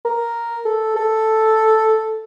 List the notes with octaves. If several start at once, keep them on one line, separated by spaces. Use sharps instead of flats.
A#4
A4
A4